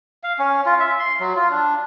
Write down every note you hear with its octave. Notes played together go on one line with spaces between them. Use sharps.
F5
C#4
F4
E5
C6
F#3
F4
D4